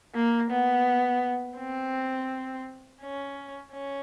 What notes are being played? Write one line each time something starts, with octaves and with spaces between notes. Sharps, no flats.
A#3
B3
C4
C#4
C#4